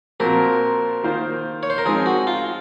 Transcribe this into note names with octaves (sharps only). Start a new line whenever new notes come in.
A#2 F3 C4 F#4 A#4
D#3 A#3 F4 C5
C#5
C5
A#4
F3 G#3 C4 D#4 G#4
F#4
F4